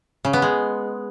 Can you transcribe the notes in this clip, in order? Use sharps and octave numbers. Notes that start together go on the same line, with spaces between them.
C#3
B3
G#3